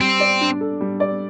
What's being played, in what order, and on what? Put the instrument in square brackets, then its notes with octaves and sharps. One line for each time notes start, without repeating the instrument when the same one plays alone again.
[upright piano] G3 [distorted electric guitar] C4
[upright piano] D5
D4
A4
G3
D5